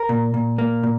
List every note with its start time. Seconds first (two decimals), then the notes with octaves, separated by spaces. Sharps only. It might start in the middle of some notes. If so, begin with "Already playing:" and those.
Already playing: A#4
0.09 A#2
0.34 A#2
0.58 A#3
0.83 A#2